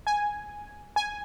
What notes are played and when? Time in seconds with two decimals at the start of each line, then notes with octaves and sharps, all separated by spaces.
0.07 G#5
0.96 G#5